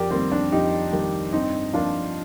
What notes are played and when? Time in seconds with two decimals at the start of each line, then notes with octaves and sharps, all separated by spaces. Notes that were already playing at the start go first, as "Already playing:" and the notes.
Already playing: F2 G4 A#4 D5
0.11 D#3 G3 A#3 C4
0.32 D4
0.52 F2 D#4 G4
0.92 D#3 G3 A#3
1.33 G2 C4 D#4
1.74 F3 A#3 D4 F4